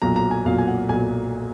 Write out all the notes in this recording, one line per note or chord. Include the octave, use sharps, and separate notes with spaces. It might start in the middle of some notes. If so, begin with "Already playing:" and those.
B1 A#2 F#3 A#5
A#5
G#5
B1 A#2 F#3 F5
G#5
F#5
B1 A#2 F#3 G#5